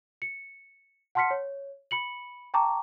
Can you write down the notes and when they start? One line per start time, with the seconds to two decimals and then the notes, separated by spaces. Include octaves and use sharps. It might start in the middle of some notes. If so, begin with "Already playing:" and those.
0.22 C#7
1.15 F#5 A5 C6 F6 B6 C#7
1.31 C#5
1.91 B5 C#7 F#7
2.54 G5 A5 A#5 C#6 D6